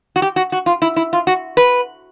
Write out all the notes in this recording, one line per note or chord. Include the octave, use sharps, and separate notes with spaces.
F#4
G4
F#4
F#4
F4
E4
E4
F4
F#4
B4